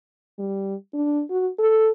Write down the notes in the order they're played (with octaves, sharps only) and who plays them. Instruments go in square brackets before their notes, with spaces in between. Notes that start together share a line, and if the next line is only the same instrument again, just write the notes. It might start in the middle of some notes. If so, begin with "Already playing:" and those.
[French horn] G3
D4
F#4
A4